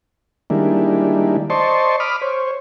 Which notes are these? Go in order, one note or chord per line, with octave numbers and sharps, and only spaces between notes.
D#3 G3 G#3 A#3 D4 E4
C5 D5 D#5 A5 C6 C#6
B5 D6 D#6 F6
C5 C#5